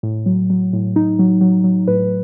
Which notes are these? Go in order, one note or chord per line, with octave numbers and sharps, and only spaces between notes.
A2
F#3
F#3
A2
D#4
F#3
F#3
F#3
A2 B4